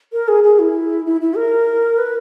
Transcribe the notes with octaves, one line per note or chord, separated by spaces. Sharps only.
A#4
G#4
G#4
E4
E4
E4
A#4
B4